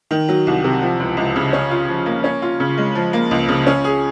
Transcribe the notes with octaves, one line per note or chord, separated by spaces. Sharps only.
D#3
F#3
C2
C3
F3
C#2
C#2
C#3
C#4
F4
F3
A#3
C#4
F4
C#3
G#3
F3
A#3
C#2
C#3
C#4
G#4